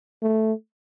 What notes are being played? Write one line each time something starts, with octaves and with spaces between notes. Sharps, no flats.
A3